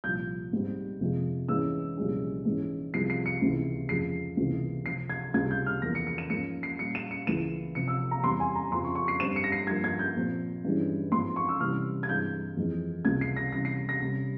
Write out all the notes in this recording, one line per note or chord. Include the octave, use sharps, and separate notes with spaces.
C2 A#2 F3 G6
G#2 G3 C4
F2 C3 F3 G#3
G#2 E3 G#3 C#4 E6
C2 A#2 F3 G#3 C#4
G#2 E3 G#3 C#4
C2 C3 F3 G#3 C4 C7
C7
C#7
C#2 C3 E3
F2 C#3 F3 G#3 C7
C#2 C3 E3 A#3
C3 F3 C4 C7
G#6
C#2 C3 G3 G#6
G6
F6
E2 C#3 F3 A#3 A#6
C#7
C#7
E7
G#2 F3 A#3 C#4 C#7
C7
A#2 G3 C#4 C#7
E7
C#7
C#2 C#3 E3 A#3 E7
C3 F3 C4 C#7
E6
A#5
E2 E3 G3 C4 C6
G#5
A#5
F2 C#3 F3 C4 C6
C#6
C#6
C7
G2 G3 C4 E7
C#7
A#6
C7
G2 F3 A#3 G#6
G#6
G6
A#2 F3 C4
G2 E3 G#3 C#4
G#2 F3 C4 C6
C#6
E6
C3 E3 G3 C#4 F6
G#6
G2 E3 G#3 C4 G6
F2 E3 G#3 C4
C#2 C3 G3 A#3 G#6
C7
A#6
C3 E3 G3 C#4 A#6
C7
A#6
C3 G3 C#4